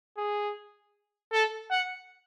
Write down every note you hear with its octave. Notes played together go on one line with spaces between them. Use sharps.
G#4
A4
F#5